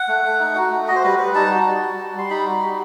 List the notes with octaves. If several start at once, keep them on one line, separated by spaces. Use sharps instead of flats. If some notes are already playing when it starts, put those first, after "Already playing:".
Already playing: F#5
A3
A3
D#4
F#4
A3
F#4 D#5
C5
G3 B4
G3 B4
D#4 A5
F#4
G3
F#4
G3
G3 C6
D#4 B5
F#4
G3